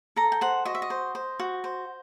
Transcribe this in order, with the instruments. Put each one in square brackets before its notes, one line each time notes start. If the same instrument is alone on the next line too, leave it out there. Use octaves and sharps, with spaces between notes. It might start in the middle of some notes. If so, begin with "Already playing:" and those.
[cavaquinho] A4 A#5
G5
C5 F#5
F#4 D#5
E5
D#5
C5
C5
F#4
C5